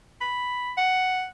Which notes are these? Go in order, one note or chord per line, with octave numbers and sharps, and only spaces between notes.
B5
F#5